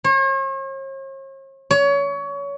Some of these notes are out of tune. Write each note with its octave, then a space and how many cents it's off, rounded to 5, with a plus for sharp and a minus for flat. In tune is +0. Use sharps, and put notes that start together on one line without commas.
C#5 -45
C#5 +25